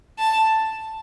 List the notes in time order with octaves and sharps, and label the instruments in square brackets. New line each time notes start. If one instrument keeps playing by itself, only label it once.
[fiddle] A5